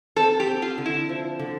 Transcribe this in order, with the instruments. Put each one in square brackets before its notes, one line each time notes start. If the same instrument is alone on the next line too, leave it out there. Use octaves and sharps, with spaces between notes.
[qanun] C4 [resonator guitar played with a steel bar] A4
[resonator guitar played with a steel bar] G4
[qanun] C4
[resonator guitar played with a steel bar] F4
[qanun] D3
[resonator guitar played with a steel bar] E4
[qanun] F3
D3